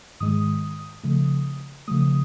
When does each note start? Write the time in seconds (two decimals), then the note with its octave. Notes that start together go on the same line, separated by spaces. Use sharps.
0.20 G#2 D#3 G#3 D#6
1.03 C#3 F3 A3
1.88 C#3 F3 A3 D#6